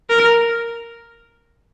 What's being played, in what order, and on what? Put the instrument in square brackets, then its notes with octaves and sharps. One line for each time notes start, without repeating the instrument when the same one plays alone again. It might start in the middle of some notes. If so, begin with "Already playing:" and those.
[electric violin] A#4